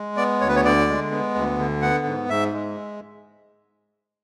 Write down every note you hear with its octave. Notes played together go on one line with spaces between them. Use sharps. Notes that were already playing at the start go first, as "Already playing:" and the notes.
Already playing: G#3
B3 D5
D2 C#5
B4
C#5
D3 D5
G#3
B3
D2
D3
B3 F#5
G#2
G#2 E5
G#3